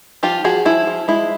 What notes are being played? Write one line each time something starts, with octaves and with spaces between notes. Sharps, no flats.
F3 F4 G4
F3 F#4 G#4
F3 E4
F3
G#3 E4